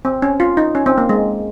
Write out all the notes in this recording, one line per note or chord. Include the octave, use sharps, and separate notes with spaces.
C4
C#4
F4
D#4
C#4
C4
A#3
G#3